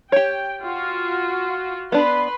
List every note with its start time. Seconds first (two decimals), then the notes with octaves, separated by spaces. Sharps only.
0.12 G4 C#5 G5
0.63 F4 F#4
1.92 B3 D4 B4 B5 C6